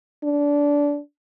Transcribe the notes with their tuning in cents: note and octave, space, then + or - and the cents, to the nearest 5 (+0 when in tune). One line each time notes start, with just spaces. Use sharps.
D4 -20